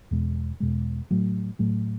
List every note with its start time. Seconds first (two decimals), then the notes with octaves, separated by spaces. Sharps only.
0.11 E2 B2 G#3
0.60 E2 B2 G#3
1.11 A2 F#3 A3
1.59 A2 F#3 A3